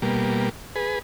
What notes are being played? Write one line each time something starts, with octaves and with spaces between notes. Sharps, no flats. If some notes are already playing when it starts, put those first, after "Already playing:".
B2 G3 A#3
G#4 B4